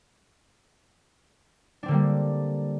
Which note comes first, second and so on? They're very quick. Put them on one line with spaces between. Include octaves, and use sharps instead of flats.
D4 C4 D3 A#3 G3